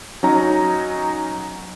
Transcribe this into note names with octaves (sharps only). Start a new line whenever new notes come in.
F#3 C#4 D#4 A#5